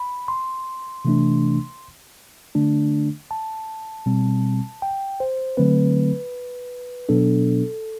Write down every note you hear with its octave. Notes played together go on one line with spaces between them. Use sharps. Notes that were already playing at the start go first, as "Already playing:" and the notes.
Already playing: B5
C6
C3 E3 A3 D4
D3 A3 D4
A5
B2 G3 C4
G5
C5
D3 F#3 A3 C4 B4
B2 F#3 B3 D4 A4